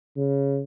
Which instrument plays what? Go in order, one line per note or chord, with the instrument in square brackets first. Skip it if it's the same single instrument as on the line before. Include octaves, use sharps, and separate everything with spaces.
[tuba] C#3